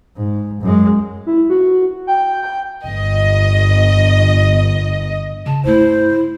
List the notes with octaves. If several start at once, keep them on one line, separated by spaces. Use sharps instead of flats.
G#2
F#2 G#3
E4
F#4
G5
G5
G1 D#5
C#3 A5
G2 A3 E4 C5